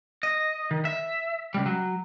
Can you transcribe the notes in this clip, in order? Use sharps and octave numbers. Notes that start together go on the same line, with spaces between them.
D#5
D#3
E5
C#2 G3
F#3